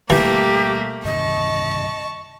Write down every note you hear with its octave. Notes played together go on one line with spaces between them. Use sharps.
B2 E3 G3 A3 A#3 G4
G2 C3 D#3 D#5 A5 C#6